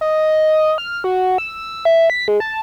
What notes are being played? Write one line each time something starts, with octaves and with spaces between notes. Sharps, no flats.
D#5
F6
F#4
E6
E5
B6
G#3
A5